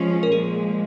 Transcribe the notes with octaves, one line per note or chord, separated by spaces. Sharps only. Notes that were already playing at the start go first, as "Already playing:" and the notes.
Already playing: F3 G#3 C#4 F4
A#4
A#2 F3 G#3 G#4